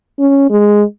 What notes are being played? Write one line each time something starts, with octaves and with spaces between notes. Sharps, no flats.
C#4
G#3